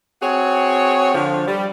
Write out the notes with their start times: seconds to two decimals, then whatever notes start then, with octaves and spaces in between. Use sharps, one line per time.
0.23 C4 F#4 G#4 C#5
1.14 D3 F3
1.48 G3